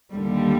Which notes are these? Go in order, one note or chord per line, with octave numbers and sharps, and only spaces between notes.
D#2 D3 G3